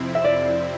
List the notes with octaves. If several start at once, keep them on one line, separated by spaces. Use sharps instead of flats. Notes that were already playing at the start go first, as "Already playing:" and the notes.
Already playing: F2 C3 F3 C4 E4
E5
D5